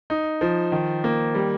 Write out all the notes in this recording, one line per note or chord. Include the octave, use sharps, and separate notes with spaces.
D#4
F3
D#3
A#3
G3